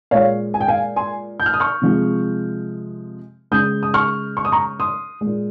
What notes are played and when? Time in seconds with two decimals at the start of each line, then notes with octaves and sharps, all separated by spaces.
0.11 A#2 G#3 C#5 F5
0.54 G#5
0.60 G5
0.68 F5 G#5
0.96 G#5 C6
1.40 G6
1.46 F6
1.54 D#6
1.60 C#6 F6
1.82 C3 F3 G#3
3.51 C#3 G#3 D#6 G6
3.83 D#6
3.94 C#6 F6
4.37 C#6
4.45 D#6
4.52 A#5 C#6
4.80 C6 D#6
5.21 A#2 G#3